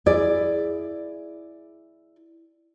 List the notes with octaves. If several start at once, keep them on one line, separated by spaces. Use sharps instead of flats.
E4 G#4 D5